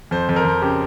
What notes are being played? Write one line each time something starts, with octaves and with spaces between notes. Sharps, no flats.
F2 C5
F2
A#4
F2
C#3 G4